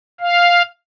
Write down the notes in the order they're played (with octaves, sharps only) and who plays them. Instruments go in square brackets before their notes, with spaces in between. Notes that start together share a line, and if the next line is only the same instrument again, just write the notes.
[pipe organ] F5